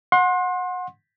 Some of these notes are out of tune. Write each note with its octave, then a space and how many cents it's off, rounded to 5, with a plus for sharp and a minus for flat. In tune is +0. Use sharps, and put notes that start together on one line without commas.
F#5 -25 C6 +30